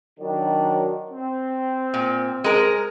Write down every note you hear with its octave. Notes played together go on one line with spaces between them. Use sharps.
D#3 F#3 D4
C4
A#2
G#3 A#4